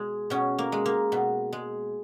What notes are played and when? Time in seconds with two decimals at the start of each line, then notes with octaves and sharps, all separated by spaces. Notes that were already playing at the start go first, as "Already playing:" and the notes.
Already playing: B2 G#3
0.30 B2 C#4
0.59 A#3
0.72 G#3
0.86 A#3
1.12 B2
1.53 G#3